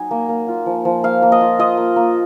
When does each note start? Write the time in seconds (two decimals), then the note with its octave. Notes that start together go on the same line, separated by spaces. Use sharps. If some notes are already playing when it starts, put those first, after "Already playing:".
Already playing: F#3 D#4 G#5
0.11 A#3
0.29 A#3
0.48 F4
0.66 F3
0.85 F3
1.03 A#3 F5
1.22 A#3
1.32 D#5
1.41 F4
1.59 F4 D#5
1.77 A#3
1.96 A#3